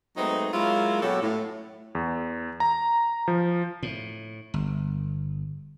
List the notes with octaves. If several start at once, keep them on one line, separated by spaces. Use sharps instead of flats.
F#3 G#3 A3 B3 C4 D#4
F#3 G#3 A#3 E4 F4
B2 F#3 C#4 F#4 G4 A4
A2
E2
A#5
F3
A2
G1